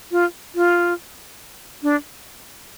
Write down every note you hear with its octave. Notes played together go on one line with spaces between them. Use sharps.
F4
F4
D4